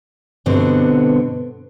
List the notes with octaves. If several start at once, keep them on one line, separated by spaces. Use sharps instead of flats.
G2 B2 D3 B3 C4